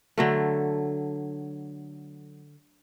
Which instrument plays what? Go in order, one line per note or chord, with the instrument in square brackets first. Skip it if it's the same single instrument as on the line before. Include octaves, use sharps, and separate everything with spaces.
[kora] D3 F#3 A3